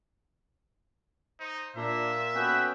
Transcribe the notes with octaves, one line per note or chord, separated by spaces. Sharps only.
D#4 C5
A#2 D4 E5 A#5 C6
B3 C#4 F#4 A4 B4 G5